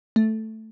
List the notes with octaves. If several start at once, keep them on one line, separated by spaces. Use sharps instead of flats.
A3